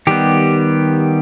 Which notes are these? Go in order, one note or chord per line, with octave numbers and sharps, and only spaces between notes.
D#3 G3 B3 G4